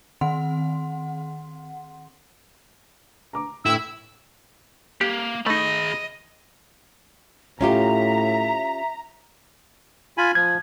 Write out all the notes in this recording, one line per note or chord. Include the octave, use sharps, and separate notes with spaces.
D#3 C4 F#5 C6
A#5 D6
A2 E4 G5 E6
A#3 G4
A3 D#4 G#4 D#5 B5
A2 C#4 F4 G4 E5 A#5
F4 G#5 B5
F3 G#6